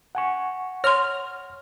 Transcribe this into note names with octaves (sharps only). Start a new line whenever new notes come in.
F#5 G#5 C#6
C#5 C6 F6